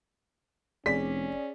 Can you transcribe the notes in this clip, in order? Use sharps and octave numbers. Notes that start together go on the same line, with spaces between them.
F1 C#4 G#4 D5 B6